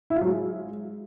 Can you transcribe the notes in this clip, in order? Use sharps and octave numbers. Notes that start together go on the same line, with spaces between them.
E4
F4
F#3
G#3